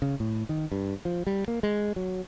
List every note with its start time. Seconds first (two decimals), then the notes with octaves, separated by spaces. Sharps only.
0.02 C#3
0.20 A2
0.49 D#3
0.72 G2
1.05 F3
1.27 G3
1.48 A#3
1.63 G#3
1.96 F#3